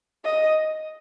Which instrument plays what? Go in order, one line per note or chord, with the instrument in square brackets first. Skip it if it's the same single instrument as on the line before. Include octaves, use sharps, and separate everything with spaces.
[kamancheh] D#5